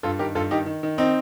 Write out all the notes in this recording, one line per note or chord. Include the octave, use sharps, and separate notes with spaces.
G2 F4 A4
D#3 G4 A#4
G2 F4 A4
D#3 D#4 G4
D#3
D#3
C4 D#4